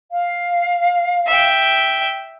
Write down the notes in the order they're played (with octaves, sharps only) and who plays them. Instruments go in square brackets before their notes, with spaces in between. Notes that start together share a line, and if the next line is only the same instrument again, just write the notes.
[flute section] F5
[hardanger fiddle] E5 G5